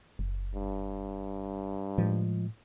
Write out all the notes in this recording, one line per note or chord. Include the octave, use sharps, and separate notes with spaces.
F#1
G2
A2 F3 G#3